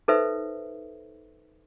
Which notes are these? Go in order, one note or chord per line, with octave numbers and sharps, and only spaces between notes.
D#4 A4 B4 C5 E5